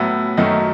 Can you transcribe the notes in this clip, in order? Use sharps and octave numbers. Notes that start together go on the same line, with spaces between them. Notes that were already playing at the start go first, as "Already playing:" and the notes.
Already playing: A2 F#3 B3 E5
F#2 D#3 F#3 A3 D#5